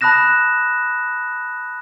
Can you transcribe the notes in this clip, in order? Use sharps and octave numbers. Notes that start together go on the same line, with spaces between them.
A5 B5 D#6 F#6 A#6 E7